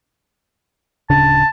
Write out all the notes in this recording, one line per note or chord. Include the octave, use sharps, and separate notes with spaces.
D1 C#3 D4 A5